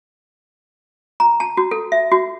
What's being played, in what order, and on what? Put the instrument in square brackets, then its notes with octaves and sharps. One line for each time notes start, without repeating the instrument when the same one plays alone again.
[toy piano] A#5
A5
F#4
A4
E5
F#4